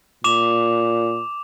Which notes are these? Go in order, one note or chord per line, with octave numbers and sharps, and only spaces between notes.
A#2 D6 E7 F7